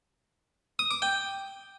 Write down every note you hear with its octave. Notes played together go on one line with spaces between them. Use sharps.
D#6
D6
G5